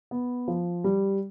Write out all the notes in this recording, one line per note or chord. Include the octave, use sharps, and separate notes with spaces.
B3
F3
G3